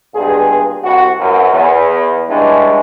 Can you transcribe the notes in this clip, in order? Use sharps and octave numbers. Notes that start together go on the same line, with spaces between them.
B1 G2 A#2 G#4
C2 F#4
A1 F#2 F#3 A#4
E2
G2 G#3 C#4 D4 E4